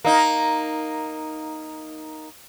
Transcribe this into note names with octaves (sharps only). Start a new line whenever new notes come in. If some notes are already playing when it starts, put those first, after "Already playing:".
A#3 D#4